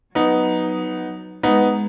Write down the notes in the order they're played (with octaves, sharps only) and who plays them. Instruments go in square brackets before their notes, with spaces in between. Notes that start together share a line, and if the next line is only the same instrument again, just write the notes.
[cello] F#3 [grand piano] B3 D#4
[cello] G#3 [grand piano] B3 D#4